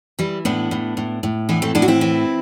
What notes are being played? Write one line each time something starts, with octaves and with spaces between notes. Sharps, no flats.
E3 G3
A2 B3 D4
A2
A2
A2
E3 B3 D4
A3 C4
A2 B3 D4
F#4
C4 E4
E3